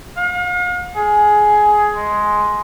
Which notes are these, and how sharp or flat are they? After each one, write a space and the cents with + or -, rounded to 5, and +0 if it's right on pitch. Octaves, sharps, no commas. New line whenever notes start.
F5 +45
G#4 +10
G#3 +10